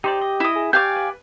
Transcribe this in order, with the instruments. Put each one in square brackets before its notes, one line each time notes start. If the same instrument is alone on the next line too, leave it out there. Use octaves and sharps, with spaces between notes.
[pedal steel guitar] D#4 C5 D5 [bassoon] G4
[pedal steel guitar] D#5
[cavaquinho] E4 D#6
[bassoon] G#4
[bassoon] G4 [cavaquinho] D5 F5 G#5 [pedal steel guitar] C#6 G6
[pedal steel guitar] B4